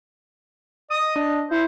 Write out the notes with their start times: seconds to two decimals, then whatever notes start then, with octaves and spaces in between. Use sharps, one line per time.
0.90 D#5 D#6
1.16 D4
1.51 E4 C5